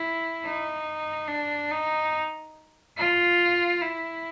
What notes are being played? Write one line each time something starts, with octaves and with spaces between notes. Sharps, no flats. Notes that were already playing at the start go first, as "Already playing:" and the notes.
Already playing: E4
D#4
D4
D#4
F4
E4